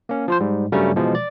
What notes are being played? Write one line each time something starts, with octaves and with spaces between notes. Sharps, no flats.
A#3 C#4
F3 F4 C5
G#2 G3
G2 C#3 F#3 G3 A3 C#4
B2 E3 F3 G#3
D5